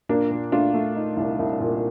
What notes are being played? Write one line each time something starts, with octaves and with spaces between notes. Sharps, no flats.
A#2 A#3 D4
A#2
A3 D4 F4
A3
D#4
C2
C2
A#2